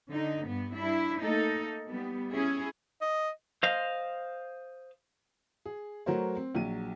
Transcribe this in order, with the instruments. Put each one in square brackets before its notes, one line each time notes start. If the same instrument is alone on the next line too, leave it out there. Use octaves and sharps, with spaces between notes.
[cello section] D3 D#4
G2 B3
D4 E4
A3 A#3 D#4 A4
G3 B3
C#4 E4 G#4
[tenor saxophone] D#5
[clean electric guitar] C5 D#5 F5
[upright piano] G#4
F#3 A3 F#4 A#4 C5 C#5
C4
A#1 F#3 D#7